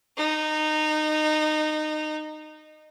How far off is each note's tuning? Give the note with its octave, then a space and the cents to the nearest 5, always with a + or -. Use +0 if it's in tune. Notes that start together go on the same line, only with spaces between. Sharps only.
D#4 -20